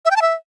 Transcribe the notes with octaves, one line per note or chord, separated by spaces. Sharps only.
E5
G5
A5
E5